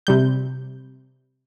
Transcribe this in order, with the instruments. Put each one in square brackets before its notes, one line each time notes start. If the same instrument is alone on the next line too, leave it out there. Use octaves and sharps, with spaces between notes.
[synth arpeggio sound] C3 G3 G6